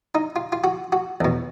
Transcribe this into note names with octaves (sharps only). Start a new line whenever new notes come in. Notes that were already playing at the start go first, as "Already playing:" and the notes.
D#4
F4
F4
F#4
F#4
E2 B2